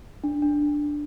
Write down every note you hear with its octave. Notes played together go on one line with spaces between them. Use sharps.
D4
D4